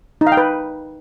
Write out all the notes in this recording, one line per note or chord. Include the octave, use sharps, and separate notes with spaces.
D#4
F5
G5
B4